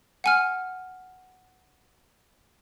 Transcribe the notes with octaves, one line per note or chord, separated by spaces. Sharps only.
F#5 G#5 F6